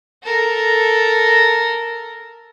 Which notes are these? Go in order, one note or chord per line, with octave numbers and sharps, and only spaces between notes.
A4 A#4